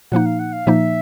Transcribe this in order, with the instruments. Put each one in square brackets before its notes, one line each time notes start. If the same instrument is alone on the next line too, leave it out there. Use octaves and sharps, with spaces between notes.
[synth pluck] A#2 F3 A#3 D#4 [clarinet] F#5
[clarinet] F5
F#5
F5
[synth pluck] A#2 F3 A#3 D#4 [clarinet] E5